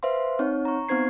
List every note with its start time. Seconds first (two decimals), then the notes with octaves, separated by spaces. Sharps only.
0.03 B4 C5 E5 F5 C6
0.39 C4 D#4 C#5
0.65 A#5 C#6
0.89 B3 C4 D#4 C5 G#6 C7